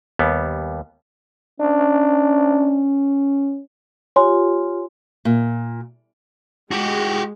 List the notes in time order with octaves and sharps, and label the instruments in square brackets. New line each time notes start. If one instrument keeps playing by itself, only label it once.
[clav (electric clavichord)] D#2 G3 B3
[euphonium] C#4 [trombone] D4
[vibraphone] F4 G4 [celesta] C#5 G#5 C6
[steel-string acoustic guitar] A#2
[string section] G#3 [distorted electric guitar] F#4 G4